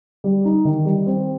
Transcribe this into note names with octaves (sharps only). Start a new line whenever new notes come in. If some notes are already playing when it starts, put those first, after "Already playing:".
G3
D#4
D#3
G3
C4